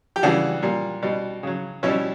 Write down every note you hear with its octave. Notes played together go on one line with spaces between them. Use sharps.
G4
C#3 E3 G3 D4 F#4
A#2 G3
B2 G3
C#3 F#3
B2 G3 C#4 E4